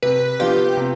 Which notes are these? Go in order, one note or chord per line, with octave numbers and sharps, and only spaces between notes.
C3 B4
F3 B3 D4 F4 G4
C3